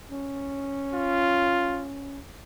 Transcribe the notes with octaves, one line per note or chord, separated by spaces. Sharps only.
C#4
F4